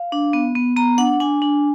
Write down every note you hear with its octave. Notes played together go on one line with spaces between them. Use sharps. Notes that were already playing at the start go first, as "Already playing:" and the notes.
Already playing: F5
D4
B3
B3
B3 A#5
D4 F#5
D4 G#5
D4